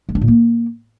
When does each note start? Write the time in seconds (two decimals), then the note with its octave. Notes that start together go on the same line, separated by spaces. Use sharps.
0.09 G#3
0.15 D4
0.21 A#2
0.28 A#3